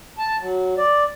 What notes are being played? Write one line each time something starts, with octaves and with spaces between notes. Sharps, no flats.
A5
F#3
D5